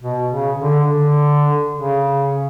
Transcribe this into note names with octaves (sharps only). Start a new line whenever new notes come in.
B2
C#3
D3
D3
C#3